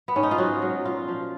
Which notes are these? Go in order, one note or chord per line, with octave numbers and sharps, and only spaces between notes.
B3
G#2 C#4
D#4
F4
F#3 F#4
F#3
A#2 F4
F3